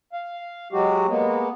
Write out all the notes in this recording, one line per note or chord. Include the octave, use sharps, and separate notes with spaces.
F5
F#3 G#3 F#4 G4
G#3 A#3 B3